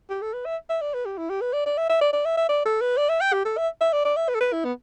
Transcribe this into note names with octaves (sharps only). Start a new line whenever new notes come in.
G4
A4
B4
E5
E5
D5
B4
G4
E4
G4
B4
D5
D5
E5
E5
D5
D5
E5
E5
D5
A4
B4
D5
E5
G5
G4
A4
E5
E5
D5
D5
E5
B4
A4
B4
E4
B3